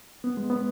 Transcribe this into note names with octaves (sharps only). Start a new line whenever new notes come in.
B3
G#3
B3